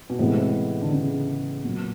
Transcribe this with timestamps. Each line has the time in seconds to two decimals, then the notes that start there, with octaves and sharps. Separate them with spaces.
0.10 B2
0.19 A2 C3 E3 G#3 B3
0.37 C3
0.82 D3
0.92 C#3
1.64 A#2 F#3 B3